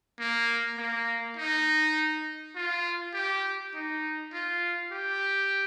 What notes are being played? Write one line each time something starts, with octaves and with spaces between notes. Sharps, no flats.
A#3
A#3
D#4
F4
G4
D#4
F4
G4